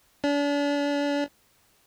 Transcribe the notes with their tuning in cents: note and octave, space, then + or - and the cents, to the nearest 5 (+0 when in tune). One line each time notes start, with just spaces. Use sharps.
D4 -40